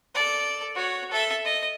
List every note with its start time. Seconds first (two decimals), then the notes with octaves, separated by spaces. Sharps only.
0.15 A4 D5
0.75 F#4 C#5
1.11 A4 E5
1.45 D#5